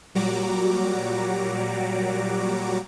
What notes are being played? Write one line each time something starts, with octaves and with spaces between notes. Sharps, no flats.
A#2 F#3 G3 F#4 A#5 D6